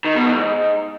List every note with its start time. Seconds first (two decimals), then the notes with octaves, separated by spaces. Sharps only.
0.04 D#3
0.15 B2
0.26 E2
0.36 G#2